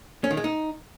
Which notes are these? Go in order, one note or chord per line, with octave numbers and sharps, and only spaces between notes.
C#4
D#3
G#3
D#4